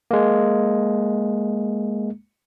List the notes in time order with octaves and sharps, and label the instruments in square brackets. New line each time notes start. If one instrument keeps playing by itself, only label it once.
[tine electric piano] G#3 A#3